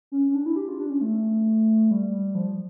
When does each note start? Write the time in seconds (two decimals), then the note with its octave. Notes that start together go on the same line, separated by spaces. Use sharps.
0.12 C#4
0.23 C#4
0.35 D4
0.46 E4
0.56 G4
0.68 F4
0.79 D4
0.90 C#4
1.01 A3
1.91 G3
2.35 F3